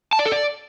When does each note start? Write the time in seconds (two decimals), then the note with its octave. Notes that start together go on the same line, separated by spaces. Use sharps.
0.13 A5
0.19 D5
0.25 A4
0.32 D5